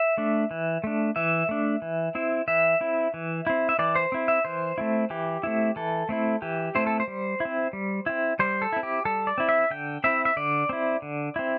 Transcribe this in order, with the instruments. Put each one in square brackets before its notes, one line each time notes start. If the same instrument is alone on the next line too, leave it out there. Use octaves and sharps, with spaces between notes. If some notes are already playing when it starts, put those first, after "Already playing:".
Already playing: [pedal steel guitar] E5
A3 D4
E3
A3 D4
E3 E5
A3 D4
E3
C4 E4
E3 E5
C4 E4
E3
C4 E4
E5
E3 D5
C5
C4 E4
E5
E3 C5
A3 C4 E4
E3 G4
A3 C4 E4
E3 A4
A3 C4 E4
E3 G4
A3 C4 E4 C5
A4
C5
G3
E4
C4
G3
C4 E4
G3 C5
A4
C4 E4
G4
G3 A4
D5
C4 E4
E5
D3 G5
C4 E4 E5
E5
D3 D5
C4 E4
D3
C4 E4